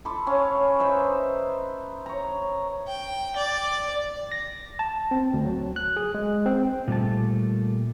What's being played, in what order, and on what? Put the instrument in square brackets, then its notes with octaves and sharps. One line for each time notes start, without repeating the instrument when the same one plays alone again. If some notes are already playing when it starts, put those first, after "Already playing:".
[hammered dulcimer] A4 B5 C6 D6
C#4 C#5 F5
D#4 B4 C5 E5
C#5 A#5
[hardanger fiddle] G5
D5
[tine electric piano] A#6
A5
C4
D2
F#3
F#6
G#4
G#3
C4
[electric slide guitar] A#2 G3 A3 A5